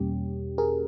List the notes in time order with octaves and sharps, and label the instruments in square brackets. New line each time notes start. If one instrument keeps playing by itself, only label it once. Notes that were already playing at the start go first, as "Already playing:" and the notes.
Already playing: [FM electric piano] E2 B2 G3 A#3 C#4 G4
G#4 A#4